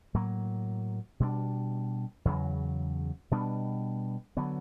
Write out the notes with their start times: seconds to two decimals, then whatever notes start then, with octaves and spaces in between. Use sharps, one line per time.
0.14 A2 F#3 A#3
1.20 B2 G3 B3 D4
2.25 E2 C#3 F#3
3.31 B2 G3 B3 D4
4.37 D3 F#3 B3